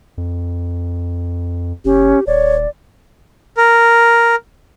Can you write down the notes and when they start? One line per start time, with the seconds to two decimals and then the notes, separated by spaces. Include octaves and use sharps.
0.18 F2
1.85 F#1 C#4 G4
2.27 D#1 C#5 D5
3.57 A#4